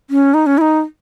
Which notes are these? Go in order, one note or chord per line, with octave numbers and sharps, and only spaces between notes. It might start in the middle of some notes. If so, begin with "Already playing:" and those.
C#4
D#4
C#4
E4
D#4